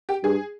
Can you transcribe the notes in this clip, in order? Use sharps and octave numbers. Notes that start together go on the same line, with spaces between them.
G4
G2 G#4